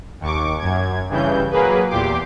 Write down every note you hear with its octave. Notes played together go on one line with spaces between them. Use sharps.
D#2 C#6 D6
F#2 G#6
G2 C#3 E3 G6
F#3 A#3 G#4 B4
E2 A#2 G4 C6 D6